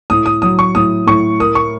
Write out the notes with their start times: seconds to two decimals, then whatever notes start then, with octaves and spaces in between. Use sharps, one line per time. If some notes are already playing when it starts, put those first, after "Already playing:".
0.10 A2 D#6
0.26 D#6
0.42 F#3 D#6
0.59 C#6
0.75 A2 D#6
1.07 A2 C#6
1.40 A#4 D#6
1.55 C#6